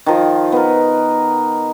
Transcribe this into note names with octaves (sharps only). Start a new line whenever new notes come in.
D#3 F3
B3 A#4